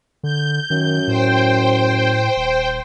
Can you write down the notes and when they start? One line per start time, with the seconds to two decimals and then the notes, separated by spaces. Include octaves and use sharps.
0.23 D3 G6
0.70 F#2 D#3
1.07 A2 C5 G5
2.36 D#1